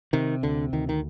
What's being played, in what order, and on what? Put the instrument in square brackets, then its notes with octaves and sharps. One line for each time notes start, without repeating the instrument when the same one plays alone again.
[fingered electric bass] C3 D#3
D2 D3
D2 D#3
D#3